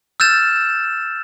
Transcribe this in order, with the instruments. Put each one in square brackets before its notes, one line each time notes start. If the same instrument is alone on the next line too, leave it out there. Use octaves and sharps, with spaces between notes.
[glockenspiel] E6 F6 G6 A6 E7